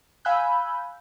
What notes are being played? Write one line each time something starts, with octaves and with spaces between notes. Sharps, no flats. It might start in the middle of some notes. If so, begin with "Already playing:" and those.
F5 G#5 B5 E6 F#6 G6